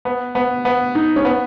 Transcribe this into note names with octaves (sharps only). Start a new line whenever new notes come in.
B3
B3
B3
D#4
C#4
B3